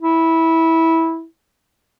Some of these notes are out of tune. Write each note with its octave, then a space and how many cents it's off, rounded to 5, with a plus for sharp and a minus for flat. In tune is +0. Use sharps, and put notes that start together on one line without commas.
E4 -15